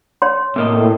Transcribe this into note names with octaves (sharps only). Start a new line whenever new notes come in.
C#5 C6
A2 C3 A#3 D#5